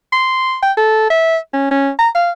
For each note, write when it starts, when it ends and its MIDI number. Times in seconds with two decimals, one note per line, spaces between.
0.13 0.58 84
0.63 0.72 79
0.77 1.07 69
1.10 1.37 76
1.53 1.69 61
1.71 1.90 61
1.99 2.09 82
2.15 2.31 77